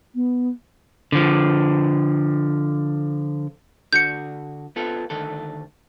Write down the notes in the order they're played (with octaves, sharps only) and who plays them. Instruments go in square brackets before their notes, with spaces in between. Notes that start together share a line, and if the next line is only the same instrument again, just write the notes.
[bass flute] B3
[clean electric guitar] D3 F3
[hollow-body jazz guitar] D3 F#4 [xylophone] G6 C#7
[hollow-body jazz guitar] B3 F4 A4
D2 D#3 A4